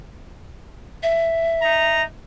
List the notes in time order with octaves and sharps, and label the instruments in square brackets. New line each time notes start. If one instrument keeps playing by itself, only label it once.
[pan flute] E5
[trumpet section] D#4 A#5